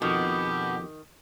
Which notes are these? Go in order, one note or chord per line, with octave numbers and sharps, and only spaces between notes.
F2 B2 D#3 F#4 G4